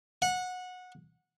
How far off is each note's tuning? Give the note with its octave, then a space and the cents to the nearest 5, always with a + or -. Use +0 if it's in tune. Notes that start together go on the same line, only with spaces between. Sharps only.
F#5 -20